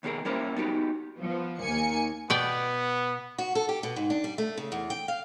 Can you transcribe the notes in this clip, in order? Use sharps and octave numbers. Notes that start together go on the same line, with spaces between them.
D#2 B2 D4 G#4 A#4
G3 A#3 C#4 E4 A#4 C5
B3 D#4 F#4 G4
F3 B3
D#2 A#3 G#5 C#7
B2 B3 D5 G5
F#4
A4
G4
B2
G#2
D4
G3
A3
C#3
E2
G5
F5